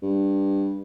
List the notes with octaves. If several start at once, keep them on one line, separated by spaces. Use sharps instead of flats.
G2